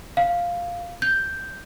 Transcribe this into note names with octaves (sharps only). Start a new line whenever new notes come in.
F5
G6